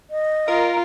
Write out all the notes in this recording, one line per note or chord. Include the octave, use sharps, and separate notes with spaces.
D#5
F4 A#4